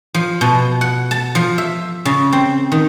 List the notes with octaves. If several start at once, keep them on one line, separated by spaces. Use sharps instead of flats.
F3
B2
F#5
A5
F3
E5
C#3
C4
D#3